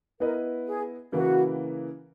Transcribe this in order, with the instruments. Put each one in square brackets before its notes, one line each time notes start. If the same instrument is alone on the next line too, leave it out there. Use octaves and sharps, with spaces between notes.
[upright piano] B3 E4 B4 D#5 [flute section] A#4
[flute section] G#4
[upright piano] C#3 E3 A#3 E4 B4 [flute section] F#4